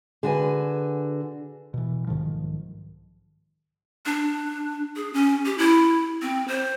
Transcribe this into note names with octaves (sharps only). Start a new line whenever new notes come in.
D3 F#4 G#4 B4 G#5
B2 E3
B1 G#2 D#3 F3
D4
G#4
C#4
G4
E4
C4
C5